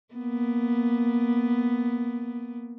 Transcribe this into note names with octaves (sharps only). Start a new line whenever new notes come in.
A#3 B3